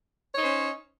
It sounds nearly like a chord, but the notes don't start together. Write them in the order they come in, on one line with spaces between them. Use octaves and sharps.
C#5 D#4 C5 C#4